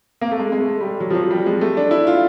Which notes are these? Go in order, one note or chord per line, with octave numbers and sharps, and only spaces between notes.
A#3
A3
G#3
G#3
A3
G3
F#3
F3
F#3
G3
G#3
A3
D4
E4
F4